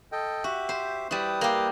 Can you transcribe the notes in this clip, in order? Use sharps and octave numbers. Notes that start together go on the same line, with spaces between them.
A4 D#5 G5
F#4 G4 E5
C5
G3 E4 B4 D#6
A#3 G4